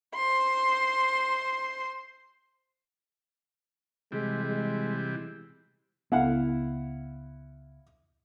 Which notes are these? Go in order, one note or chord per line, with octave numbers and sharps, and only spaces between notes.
C5 C6
C3 E3 G3 G#3
G#3
C#2 B3 E4 F5 F#5